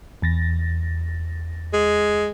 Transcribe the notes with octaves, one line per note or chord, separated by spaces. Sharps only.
E2 A6 A#6
G#3